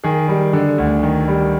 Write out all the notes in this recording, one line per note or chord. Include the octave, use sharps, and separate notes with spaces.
D#3 G#4
G3
D3
D2
D#3
G3